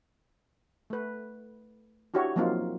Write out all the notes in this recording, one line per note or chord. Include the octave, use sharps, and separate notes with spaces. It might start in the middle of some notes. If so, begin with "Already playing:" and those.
A3 B4
D4 E4 F#4 G4 C#5
F3 F#3 A#3 C4 D#4 F4